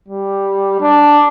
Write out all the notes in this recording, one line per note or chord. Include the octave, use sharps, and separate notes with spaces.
G3
D4